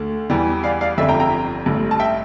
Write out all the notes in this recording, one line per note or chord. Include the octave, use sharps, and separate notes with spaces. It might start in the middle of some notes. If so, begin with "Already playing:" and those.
Already playing: D2 D3 A3
E2 E3 G3
D5 F5
D5 F5
G1 F2 D3 G3 E5
G5 A#5
G5 A#5
A1 G2 D3
A5
E5 G5